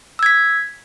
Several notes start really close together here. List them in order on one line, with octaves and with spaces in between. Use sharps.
E6 G#6 B6